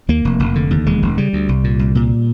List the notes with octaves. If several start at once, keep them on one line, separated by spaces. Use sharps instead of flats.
D#2 A#3
F1
F1
D3
D#2
E1 G#3
E1
C#3 G3
D2
C2
A#2
C2
A#2